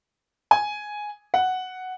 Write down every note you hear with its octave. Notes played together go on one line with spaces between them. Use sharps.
G#5
F#5